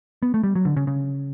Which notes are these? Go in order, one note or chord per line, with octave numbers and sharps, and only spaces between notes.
B3
A3
G3
F#3
D3
C#3
C#3